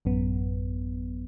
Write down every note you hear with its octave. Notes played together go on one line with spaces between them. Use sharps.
A1 F#2 B3